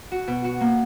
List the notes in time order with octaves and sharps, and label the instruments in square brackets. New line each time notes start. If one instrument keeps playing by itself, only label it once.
[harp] F#4
B2
F#4
A#3